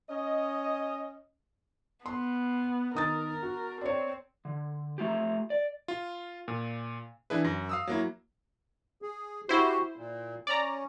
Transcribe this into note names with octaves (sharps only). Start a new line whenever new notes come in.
C#4 D#5
B3 C6
D#3 A#4 D#6 A6
F#4
C4 C#5 D5
D3
A3 F4 G4
D5
F4
A#2
E3 D4 E4 G#4 B4
F#2 A#6
F5 D#6 E6
F#3 A#3 E4
G#4
E4 F#4 G4 C5
A#2
C#4 D5 A#5